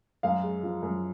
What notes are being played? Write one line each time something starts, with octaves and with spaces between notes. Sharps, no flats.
F#2 F5
G#3
F3
F#2